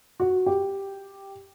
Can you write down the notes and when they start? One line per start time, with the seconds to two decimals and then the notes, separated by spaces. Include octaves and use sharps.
0.20 F#4
0.46 G4